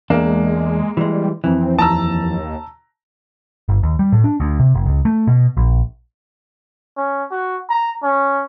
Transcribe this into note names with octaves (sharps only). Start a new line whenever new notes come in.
E2 G#3 A#3 D4
E3 G3 G#3
F2 E3 C4
D#2 A5 A#5 E6
G1
D#2
G3
A2
D4
D2
C3
F#1
C#2
A3
B2
A#1
C#4
F#4
A#5
C#4